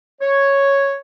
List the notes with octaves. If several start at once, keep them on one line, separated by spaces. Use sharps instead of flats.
C#5